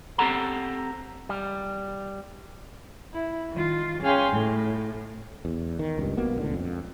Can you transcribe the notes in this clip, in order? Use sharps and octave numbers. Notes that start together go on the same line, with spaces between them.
C4 G4 A4 F#5 A#5
G3
E4
D#3 F4
C#4 G#4 F5 G5 C6
A2
E2
D#3
C#2 G2
B1 B2 A#3 B3
D#1 C#2 A2 D3
F2